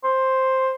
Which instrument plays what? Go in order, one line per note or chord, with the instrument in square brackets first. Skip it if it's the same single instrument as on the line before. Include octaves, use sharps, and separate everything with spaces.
[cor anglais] C5